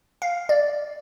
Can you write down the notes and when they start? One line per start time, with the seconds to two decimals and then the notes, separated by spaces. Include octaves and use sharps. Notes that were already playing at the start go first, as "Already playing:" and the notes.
0.22 F5
0.49 D5